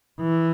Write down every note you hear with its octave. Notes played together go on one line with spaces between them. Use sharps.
E3